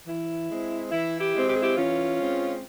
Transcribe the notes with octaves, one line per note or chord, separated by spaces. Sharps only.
E3 E4
G#3 C4
E3 E4
E4 G4
G#3 C4
G4
G#4
E4 G4
E3 C#4 F4
G#3 C4